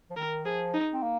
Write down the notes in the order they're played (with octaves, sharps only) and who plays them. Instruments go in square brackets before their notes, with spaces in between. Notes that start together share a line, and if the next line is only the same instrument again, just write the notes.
[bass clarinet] F3
[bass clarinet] D#3 [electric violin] A#4
[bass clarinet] F3 [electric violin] G#4
[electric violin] D#4
[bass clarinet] C4
A#3